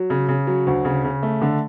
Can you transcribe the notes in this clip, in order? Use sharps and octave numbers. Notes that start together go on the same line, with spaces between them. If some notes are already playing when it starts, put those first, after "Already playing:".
Already playing: F#3
C#3
C#3
F#3
D2
C#3
C#3
A3
D3